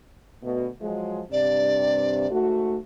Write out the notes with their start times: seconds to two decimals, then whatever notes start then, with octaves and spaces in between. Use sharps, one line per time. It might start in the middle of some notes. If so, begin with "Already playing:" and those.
0.43 D2 B2
0.81 F3 F#3 G#3
1.32 G2 C3 D5
2.31 G#2 A3 F#4